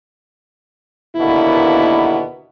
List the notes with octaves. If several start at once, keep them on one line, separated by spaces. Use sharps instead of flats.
D#2 B2 D3 A#3 B3 E4